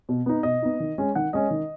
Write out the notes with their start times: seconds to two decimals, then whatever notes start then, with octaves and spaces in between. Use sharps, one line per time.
0.09 B2
0.26 B3 D#4
0.43 B2 D#5
0.62 B3 D#4
0.80 D#3
0.98 G#3 C#4
1.15 D#3 F#5
1.33 G#3 C#4 D#5
1.51 D#3